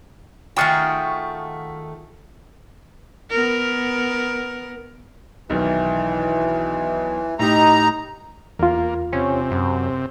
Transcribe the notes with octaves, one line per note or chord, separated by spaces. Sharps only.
D#3 A3 F4 F#4 G#4 G5
B3 A#4
B1 D#3 E3
A2 D#4 G4 A#5
E2 A#3 F4
C3 C#4
F#2